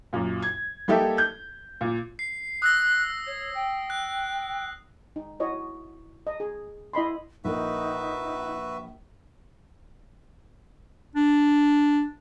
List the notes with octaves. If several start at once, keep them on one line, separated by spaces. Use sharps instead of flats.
F#2 A#2
G#6
G3 A#3 D#4 G4 A4 E5
G6
A#2
C7
D#6 E6 F#6 A#6
C#5
G5
F#6
D#4
E4 F#4 C#5 D#5
D#5
G#4
E4 D#5 B5 C6
A#1 D#4 F#4 A#4 B4 E5
D4